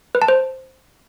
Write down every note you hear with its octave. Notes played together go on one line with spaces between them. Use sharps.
B4
A5
C5